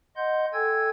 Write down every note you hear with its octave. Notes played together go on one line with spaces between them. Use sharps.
D#5 F#5 C6 G6
A4 G5 G#5 E6 G#6